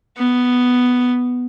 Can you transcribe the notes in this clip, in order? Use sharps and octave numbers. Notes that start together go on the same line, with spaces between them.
B3